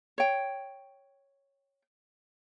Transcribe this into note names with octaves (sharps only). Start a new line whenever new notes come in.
C#5 G5